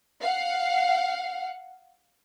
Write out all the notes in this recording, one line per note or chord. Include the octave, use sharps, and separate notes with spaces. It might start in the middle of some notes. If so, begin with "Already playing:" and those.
F5 F#5